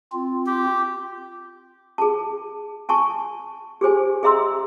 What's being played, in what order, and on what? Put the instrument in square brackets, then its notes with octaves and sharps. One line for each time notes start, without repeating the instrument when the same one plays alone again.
[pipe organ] C4 F4
[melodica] G4
[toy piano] G#4 A5
G#5 A5 C#6
G4 G#4 C5 G#5
G#4 D#5 E5 A#5 C6 E6